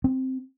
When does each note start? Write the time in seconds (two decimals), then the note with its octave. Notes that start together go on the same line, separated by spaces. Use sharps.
0.04 C4